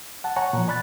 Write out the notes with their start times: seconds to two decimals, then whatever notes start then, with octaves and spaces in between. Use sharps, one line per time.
0.24 F#5 A5
0.36 C#5 F#5 G#5 A#5 C#6
0.53 A#2 F3
0.68 D5 B5 F#6 A6